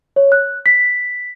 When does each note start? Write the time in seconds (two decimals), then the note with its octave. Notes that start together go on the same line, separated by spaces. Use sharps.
0.16 C#5
0.32 F#6
0.66 B6